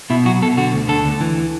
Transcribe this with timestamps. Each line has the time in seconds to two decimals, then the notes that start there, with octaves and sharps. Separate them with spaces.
0.10 B2 E4
0.25 F#3 F#4
0.42 B2 A4
0.57 D3 F#4
0.73 D2
0.88 D3 A4
1.05 D2
1.21 E3